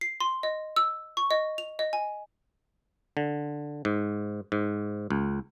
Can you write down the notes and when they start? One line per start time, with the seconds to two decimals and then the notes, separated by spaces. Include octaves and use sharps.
0.01 C7
0.20 C6
0.43 D#5
0.76 E6
1.17 C#6
1.31 D#5
1.58 F7
1.79 D#5
1.93 G#5
3.17 D3
3.85 G#2
4.52 G#2
5.10 C#2